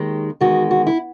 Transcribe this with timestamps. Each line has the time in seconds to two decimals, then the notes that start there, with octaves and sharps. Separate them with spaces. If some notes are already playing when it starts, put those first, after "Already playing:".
Already playing: D#2 D#3 G#3
0.41 E2 D#3 G#3 F#4
0.71 F#4
0.87 E4